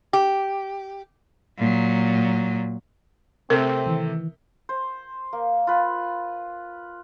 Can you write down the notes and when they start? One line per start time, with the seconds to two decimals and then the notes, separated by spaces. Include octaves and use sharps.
0.13 G4
1.58 A#2 F#3
3.50 C3 A3 C4 A#4
3.86 D#3 E3
4.69 C5
5.33 A#3
5.67 F4 B4